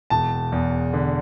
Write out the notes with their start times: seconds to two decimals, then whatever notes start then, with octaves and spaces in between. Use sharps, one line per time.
0.10 E1 A5
0.52 E2
0.94 D3